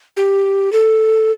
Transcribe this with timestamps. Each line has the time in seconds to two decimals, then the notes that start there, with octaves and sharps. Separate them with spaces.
0.17 G4
0.72 A4